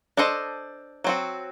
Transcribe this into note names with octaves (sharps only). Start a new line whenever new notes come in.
D4 A4 C5 D#5
F#3 C4 F#4